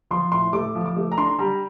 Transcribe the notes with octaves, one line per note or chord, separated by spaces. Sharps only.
F3 C6
A2 C6
A3 D6
F3
D6
A3
A#5
D4 C6
G3 A#5